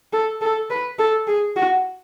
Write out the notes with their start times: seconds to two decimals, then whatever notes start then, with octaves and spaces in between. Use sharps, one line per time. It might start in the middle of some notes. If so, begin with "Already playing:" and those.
0.13 A4
0.41 A4
0.70 B4
0.99 A4
1.27 G#4
1.56 F#4